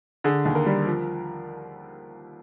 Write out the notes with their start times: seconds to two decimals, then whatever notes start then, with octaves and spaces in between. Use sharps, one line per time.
0.24 D3 G#4
0.45 D#2
0.55 A#4
0.66 G3
0.86 F3